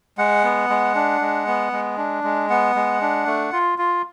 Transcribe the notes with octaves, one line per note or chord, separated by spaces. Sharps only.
G#3 F#5
B3
G#3
D4
G#3
B3
G#3
D4
G#3
B3 F#5
G#3
D4
A3
F4
F4